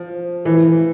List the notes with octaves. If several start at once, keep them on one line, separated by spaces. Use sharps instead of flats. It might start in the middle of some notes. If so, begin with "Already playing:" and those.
Already playing: F3
E3